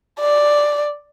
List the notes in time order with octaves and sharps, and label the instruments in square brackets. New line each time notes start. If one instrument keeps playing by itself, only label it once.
[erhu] D5